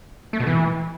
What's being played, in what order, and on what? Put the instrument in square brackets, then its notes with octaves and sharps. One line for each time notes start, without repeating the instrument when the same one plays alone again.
[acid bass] A3
B2
E3